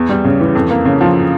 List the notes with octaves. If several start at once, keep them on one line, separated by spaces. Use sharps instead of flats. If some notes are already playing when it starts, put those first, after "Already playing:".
Already playing: E2
G3
C#3
E3
F2
A#3
C#3
F3